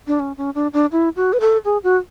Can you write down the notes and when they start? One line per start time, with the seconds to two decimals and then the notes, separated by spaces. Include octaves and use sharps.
0.07 D4
0.20 C#4
0.37 C#4
0.55 D4
0.73 D4
0.92 E4
1.16 F#4
1.33 B4
1.40 A4
1.65 G#4
1.84 F#4